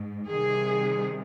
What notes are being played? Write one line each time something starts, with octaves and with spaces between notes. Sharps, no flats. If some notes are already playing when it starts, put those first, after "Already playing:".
Already playing: G#2
C3 D#3 G3 G#4